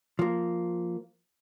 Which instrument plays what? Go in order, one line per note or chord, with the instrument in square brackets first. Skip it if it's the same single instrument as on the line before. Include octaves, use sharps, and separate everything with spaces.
[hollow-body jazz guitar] F3 A#3